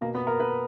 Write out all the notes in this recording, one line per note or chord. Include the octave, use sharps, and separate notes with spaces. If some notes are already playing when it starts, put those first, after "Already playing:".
B2 A#3
B3
A#4
B4